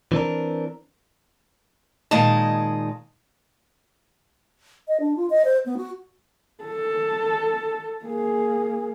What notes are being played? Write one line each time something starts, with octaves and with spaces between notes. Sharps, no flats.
E3 C4 D4 A#4
A#2 D#3 G#3 D#5 A5
D#5
D4
F4
D#5
C5
B3
F#4
A4
A#3 G#4